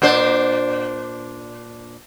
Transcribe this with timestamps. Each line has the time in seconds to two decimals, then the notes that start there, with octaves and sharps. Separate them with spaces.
0.02 A#2 D4 C5